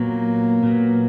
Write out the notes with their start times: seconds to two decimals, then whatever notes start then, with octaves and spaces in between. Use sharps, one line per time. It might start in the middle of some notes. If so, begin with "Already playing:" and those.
Already playing: A#2 F#3 A#3 B3
0.63 A#2 F#3 B3